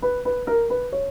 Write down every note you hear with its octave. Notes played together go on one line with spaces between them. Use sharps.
B4
B4
A#4
B4
C#5